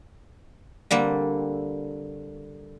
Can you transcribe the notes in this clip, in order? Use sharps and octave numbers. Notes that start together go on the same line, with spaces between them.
D3 G3 A#3 C4